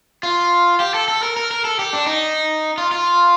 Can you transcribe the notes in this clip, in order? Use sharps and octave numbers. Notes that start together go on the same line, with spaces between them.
F4
G4
A4
A4
A#4
A#4
A#4
A4
G4
D4
D#4
F4
F4